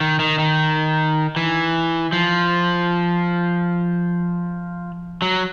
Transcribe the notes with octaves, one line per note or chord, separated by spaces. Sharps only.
D#3
D#3
D#3
E3
F3
F#3